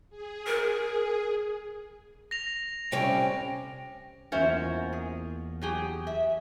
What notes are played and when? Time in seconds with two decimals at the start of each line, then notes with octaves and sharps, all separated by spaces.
0.10 G#4
0.46 A#4
2.31 A#6 F7
2.92 C3 G3 C#4 G5
4.32 E2 A#3 C#4 F4 C5 E5
4.93 G#4
5.62 F#3 G4 G#4
6.07 E5